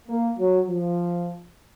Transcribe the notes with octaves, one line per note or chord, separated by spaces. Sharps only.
A#3
F#3
F3